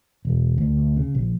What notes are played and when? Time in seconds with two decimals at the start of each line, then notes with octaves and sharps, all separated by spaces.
0.25 E1
0.58 D2
0.97 C#3
1.15 A#1